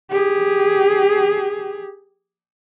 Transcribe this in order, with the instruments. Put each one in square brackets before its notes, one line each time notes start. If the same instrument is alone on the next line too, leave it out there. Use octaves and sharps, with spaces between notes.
[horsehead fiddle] G4 G#4